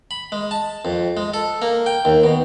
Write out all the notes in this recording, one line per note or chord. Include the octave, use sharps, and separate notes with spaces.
B5
G#3
A5
F2
G#3
A4
A#3
G5
D#2
B2